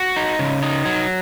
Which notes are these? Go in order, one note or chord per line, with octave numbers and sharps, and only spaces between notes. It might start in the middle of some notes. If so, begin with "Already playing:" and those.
Already playing: F#4
D#4
C#3
D#4
F#3